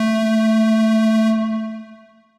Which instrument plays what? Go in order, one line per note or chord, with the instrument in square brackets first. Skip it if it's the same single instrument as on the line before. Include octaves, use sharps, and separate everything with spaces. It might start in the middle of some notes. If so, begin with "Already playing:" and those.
Already playing: [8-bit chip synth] A3